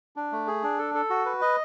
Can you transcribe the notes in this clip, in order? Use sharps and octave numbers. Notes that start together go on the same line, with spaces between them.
D4
A3
G#4
D4
A4
A4
F#4
B4
D#5